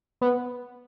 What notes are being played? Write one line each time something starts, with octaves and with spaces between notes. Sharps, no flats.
B3